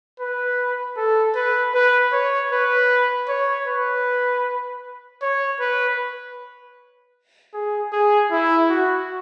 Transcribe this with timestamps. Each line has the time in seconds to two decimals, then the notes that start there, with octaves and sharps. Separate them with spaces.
0.20 B4
0.97 A4
1.35 B4
1.74 B4
2.13 C#5
2.52 B4
3.29 C#5
3.67 B4
5.22 C#5
5.60 B4
7.54 G#4
7.92 G#4
8.31 E4
8.69 F#4